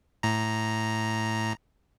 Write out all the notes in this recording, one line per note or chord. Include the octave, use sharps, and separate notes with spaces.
A2 A#5